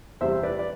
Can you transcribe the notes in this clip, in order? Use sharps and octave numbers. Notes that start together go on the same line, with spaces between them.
E2 C3 G3 C5 E5
B4 D5
D5